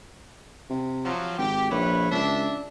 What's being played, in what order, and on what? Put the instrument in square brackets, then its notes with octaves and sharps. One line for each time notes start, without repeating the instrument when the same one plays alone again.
[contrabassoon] C3
[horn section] F3 F#3
[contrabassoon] G#1 [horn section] G4
[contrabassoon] A#1 [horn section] E4 B4 C#5
[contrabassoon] C#2 [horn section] D4 E5